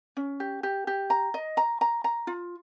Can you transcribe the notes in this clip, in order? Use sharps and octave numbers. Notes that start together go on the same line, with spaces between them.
C#4
G4
G4
G4
A#5
D#5
A#5
A#5
A#5
F4